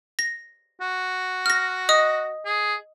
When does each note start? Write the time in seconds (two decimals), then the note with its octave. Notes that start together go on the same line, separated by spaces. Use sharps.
0.19 A#6
0.81 F#4
1.46 F6 A#6
1.89 D#5 D#6
2.46 G#4